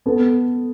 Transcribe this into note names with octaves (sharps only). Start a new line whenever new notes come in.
B3 A4